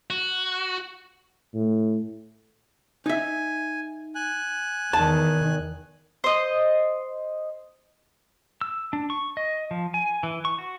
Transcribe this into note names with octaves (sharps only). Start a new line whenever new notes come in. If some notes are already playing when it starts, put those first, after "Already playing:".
F#4
A2
D#4 E5 G#5
G#5 F#6
E2 D#3 A5
C5 D#5
E6
D4
C#6
D#5
F3
G#5
E3
C#6
F#4